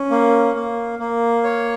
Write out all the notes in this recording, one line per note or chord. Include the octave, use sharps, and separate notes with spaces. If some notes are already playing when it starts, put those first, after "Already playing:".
Already playing: C#4
A#3
A#3
A#3
C#5